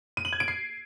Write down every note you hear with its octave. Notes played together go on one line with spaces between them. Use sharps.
D#7
F#7
G#6
D7
C7